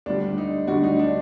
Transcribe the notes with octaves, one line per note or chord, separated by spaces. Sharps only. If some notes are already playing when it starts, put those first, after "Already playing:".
D2 D3 G3 D4
D#4
D2 D3 G3 F#4
D#4
D4